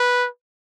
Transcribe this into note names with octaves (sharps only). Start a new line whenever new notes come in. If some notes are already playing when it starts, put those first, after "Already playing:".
Already playing: B4